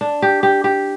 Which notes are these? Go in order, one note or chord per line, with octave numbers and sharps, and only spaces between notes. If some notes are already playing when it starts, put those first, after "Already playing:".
D4
G4
G4
G4